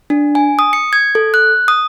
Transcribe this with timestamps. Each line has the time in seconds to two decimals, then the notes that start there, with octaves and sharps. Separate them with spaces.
0.10 D4
0.35 G#5
0.59 D#6
0.73 C#7
0.93 G#6
1.15 A4
1.34 F#6
1.68 D#6